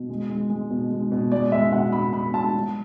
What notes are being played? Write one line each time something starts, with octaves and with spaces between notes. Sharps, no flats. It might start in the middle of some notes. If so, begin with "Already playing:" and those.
Already playing: B2
G#3
G#3
G#3
B2
G#3
B2
G#3 D5
G#3 E5
B2 F#5
B2 B5
B2 B5
G#3 A5
F#3